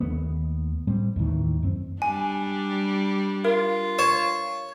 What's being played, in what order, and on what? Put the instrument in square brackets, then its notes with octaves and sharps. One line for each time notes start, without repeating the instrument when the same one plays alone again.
[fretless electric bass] D#2 A3 B3
A2 G3 C4
D#2 A2 D#3 E3
F#2 C4
[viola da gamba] G3 D4 [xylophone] G#5
[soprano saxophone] F4 [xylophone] A#4
[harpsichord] C#5 [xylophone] E7